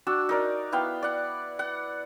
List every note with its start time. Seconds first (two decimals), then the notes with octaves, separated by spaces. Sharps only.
0.07 D4 F#4 E6
0.29 D#4 A#4 D5
0.72 B3 E4 F5 G5
1.03 D5 F#5
1.59 F#5